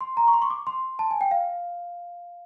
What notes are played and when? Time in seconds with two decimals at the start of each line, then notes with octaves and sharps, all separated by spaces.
0.01 C6
0.17 A#5
0.28 C#6
0.33 C6
0.42 C#6
0.50 D6
0.67 C6
0.99 A5
1.11 G#5
1.21 G5
1.31 F5